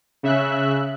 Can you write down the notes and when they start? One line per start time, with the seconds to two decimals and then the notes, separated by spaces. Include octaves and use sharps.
0.23 C#3 E5 F#6